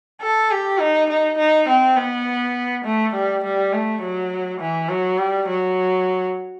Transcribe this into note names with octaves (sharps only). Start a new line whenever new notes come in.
A4
G4
D#4
D#4
D#4
C4
B3
A3
G3
G3
A3
F#3
E3
F#3
G3
F#3